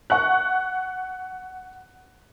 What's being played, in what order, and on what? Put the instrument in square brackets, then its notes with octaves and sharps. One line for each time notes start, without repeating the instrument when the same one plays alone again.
[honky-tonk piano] F#5 C#6 F#6